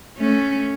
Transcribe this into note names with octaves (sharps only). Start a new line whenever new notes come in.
A3 C#4